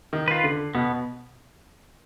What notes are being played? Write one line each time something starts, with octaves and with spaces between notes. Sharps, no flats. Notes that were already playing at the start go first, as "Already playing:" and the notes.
D#3
F4 B4
D3
B2 B3